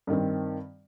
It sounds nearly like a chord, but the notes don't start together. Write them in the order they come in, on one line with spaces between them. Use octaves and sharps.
G2 D#3 C4